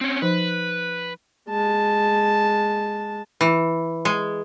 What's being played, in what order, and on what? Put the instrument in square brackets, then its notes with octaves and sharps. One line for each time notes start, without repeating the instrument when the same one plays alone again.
[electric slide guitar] C4 C#4
[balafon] F3 D#4 C5 [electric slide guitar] B4
[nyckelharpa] G#3 A5
[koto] E3
G#3